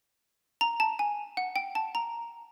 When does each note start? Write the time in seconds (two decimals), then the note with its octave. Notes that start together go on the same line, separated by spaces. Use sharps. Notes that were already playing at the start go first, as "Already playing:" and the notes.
0.61 A#5
0.80 A5
0.99 G#5
1.37 F#5
1.56 G5
1.75 A5
1.95 A#5